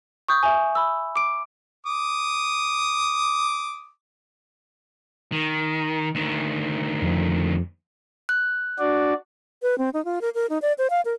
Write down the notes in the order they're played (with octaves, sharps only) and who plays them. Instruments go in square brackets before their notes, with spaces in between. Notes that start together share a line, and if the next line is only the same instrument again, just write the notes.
[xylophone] C#6 D#6 G6
E5 G#5
B5 E6
D6 D7
[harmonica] D6 D#6
[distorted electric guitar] D#3
D2 D#3
[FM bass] F2
[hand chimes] F#6
[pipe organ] D4 F#4 D5
[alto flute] B4
C4
D#4
F4
A#4
A#4
D#4
D5
C5
F5
A#4